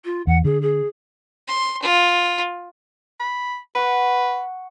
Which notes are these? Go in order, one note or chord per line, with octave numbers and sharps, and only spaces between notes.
F4
E2 F#5
D3 G#4
G#4
C6
F4
B5
B4 F#5 C#6